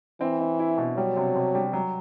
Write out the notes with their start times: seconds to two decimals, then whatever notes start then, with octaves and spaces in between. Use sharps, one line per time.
0.21 E3 C4
0.40 C4
0.59 E4
0.78 B2
0.97 F#3 G3
1.17 C3
1.36 C3
1.55 G3
1.73 F#3